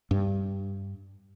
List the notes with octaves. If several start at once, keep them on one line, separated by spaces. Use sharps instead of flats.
G2